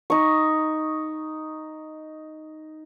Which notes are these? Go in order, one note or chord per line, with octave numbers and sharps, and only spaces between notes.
D#4 C#6